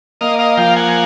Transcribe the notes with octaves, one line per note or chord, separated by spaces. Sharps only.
A#3 D#5 F5
D#5 F5
F3 F5 G5
F#5 G#5